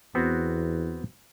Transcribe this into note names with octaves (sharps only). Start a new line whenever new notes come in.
E2 B3 C4 F#4